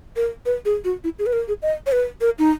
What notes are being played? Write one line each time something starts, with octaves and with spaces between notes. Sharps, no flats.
A#4
B4
G#4
F#4
E4
G#4
B4
A#4
G#4
D#5
C#5
B4
A#4
D#4